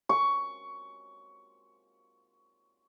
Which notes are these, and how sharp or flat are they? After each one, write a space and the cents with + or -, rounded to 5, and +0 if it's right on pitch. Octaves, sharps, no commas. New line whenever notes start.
C#6 +15